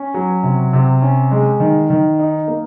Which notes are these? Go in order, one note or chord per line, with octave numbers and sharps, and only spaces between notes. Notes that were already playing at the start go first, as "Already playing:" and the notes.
Already playing: C#4
F#3
C3
C3
C#4
G#3
D#3
D#3
D#4
A#3